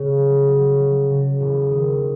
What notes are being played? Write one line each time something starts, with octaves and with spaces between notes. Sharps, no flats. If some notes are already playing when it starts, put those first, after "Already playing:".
Already playing: C#3
F#3
F#3
F#3
C#3
E1
D#3